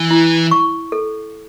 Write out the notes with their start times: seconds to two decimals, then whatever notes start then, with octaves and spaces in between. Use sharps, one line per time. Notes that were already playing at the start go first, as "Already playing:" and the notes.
Already playing: E3
0.11 E4
0.51 C#6
0.92 A4